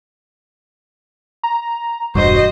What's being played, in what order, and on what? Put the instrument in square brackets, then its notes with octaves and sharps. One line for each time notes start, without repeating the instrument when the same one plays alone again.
[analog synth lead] A#5
[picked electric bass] E1 G2 [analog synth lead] F#4 [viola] C5 D#5